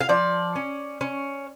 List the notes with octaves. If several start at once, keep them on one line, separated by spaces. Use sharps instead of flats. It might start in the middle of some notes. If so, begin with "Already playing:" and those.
F5
F3 D5
C#4
C#4